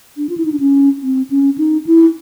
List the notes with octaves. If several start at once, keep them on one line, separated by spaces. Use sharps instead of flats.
D4
F4
E4
D#4
D4
C#4
C4
C#4
D#4
E4